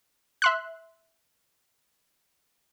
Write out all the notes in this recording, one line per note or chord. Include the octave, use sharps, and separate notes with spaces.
E5 C6 F#6